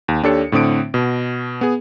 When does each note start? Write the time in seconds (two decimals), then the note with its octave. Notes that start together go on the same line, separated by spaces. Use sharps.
0.08 D#2
0.23 D#2 D4 G4 A4 C#5 C#7
0.52 A2 D3 C4 D#6 D7
0.94 B2
1.61 B3 G#4